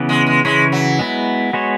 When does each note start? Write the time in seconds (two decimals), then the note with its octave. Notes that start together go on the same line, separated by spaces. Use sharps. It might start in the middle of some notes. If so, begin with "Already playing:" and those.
Already playing: C#3 E3 B3
0.09 G#3
0.27 G#3
0.45 C#3 E3 G#3 C#4 E4 C#5
0.72 F#3
0.99 G#3 B3 E4
1.53 G#3 B3 F#4 C#5